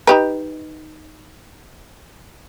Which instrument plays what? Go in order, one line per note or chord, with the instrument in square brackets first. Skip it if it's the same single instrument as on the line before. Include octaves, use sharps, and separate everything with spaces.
[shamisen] D#4 G4 B4